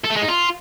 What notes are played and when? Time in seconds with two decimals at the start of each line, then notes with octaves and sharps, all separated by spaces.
0.05 A4
0.11 A3
0.17 G#3
0.23 D#4
0.28 F4